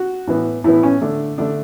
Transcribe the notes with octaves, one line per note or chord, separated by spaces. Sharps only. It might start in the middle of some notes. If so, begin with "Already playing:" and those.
Already playing: F#4
A2 E3 B3
A2 E3 B3 E4
C#4
D3 A3 D4
D3 A3 D4